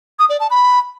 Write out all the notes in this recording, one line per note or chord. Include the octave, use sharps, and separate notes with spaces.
D#6
D5
A5
B5